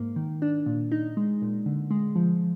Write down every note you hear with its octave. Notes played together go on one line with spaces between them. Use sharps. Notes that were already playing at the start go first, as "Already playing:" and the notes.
Already playing: G#2 A#3
D#3
D4
A#2
D#4
G#3
A#2
D3
G#3
F3